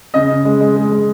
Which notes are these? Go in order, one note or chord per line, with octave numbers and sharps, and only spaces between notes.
C#3 D#5
C#3
G#3
G#3
G#3
G#3